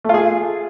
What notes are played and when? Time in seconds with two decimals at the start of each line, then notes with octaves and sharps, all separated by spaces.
0.04 A3
0.09 F4
0.14 G#4